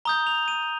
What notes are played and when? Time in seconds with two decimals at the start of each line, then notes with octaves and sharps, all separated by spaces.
0.05 A#5 D#6 G6 G7
0.27 F7
0.48 D#7